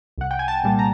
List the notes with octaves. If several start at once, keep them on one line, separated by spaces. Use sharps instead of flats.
C2 F#5
G5
G#5
A5
A#2 G3
A#5